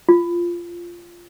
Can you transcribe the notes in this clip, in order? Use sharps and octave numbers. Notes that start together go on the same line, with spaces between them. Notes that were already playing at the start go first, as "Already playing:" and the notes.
F4